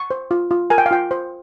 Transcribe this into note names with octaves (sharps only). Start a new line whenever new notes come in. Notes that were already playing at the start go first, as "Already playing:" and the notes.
Already playing: C#6
C5
F4
F4
A#4 G#5
G5
F5
F4 G5
C5